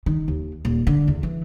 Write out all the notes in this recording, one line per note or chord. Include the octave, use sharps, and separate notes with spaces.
D#3
D#2
D#1
D3
E2
E3